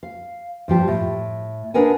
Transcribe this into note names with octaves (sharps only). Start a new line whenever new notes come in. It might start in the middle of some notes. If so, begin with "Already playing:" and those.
F5
G2 F3 G4
A2
D4 G#4 A#4 B4 F#5 G#5